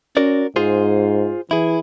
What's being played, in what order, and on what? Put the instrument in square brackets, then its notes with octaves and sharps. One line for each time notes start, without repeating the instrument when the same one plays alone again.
[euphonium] C#4 [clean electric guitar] F#4 A#4 D5
[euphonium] G#2 [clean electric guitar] F4 G#4 C5
[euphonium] E3 [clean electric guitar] E4 G#4